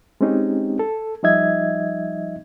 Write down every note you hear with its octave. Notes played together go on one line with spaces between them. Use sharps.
G#3 C4 C#4 D#4 G4
A4
F3 G3 D#4 D#5 E5 G#6